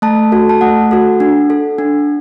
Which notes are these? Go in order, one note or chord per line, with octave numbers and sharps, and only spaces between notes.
A3 A5
F#4 A4
A5
A3 F#5
F#4 A4
D4
A4
D4